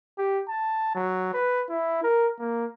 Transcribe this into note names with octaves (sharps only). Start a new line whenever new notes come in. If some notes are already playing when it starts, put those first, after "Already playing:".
G4
A5
F#3
B4
E4
A#4
A#3